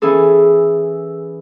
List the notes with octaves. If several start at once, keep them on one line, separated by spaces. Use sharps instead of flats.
E3 C#4 G#4 A4